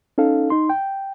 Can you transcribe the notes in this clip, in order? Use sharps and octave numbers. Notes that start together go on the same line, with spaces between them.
C#4 D#4 A4 F5
D#4 C6
G5